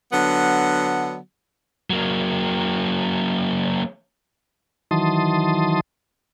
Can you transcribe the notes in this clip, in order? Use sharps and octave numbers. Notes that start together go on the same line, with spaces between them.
D3 F#3 B3
F#3 A#3
D#3 E3 F#3 A5 C6 D#6